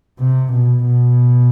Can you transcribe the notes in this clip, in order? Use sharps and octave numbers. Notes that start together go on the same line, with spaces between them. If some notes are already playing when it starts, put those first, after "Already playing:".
C3
B2
B2